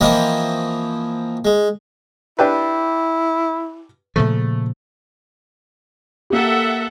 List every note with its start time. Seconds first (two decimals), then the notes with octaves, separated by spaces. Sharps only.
0.01 E3 F3 A#3 C4 E4 D#5
1.45 G#3
2.39 D4 E4 G4 B4
4.16 A#2 C#3 F3 A3
6.30 A#3 G4 A4 E5 F#5